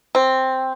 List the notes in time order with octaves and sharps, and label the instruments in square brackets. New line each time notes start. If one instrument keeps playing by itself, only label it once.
[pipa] C4